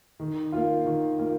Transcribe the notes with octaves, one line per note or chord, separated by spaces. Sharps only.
D#3
A#3 F4
D#3
A#3 F4